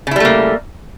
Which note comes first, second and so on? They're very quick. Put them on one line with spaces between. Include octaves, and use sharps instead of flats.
C#3 E4 G3 A3 A#3